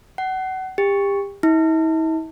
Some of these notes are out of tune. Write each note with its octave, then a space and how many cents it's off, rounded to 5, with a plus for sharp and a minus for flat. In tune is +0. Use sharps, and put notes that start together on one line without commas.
F#5 +30
G4 +30
E4 -45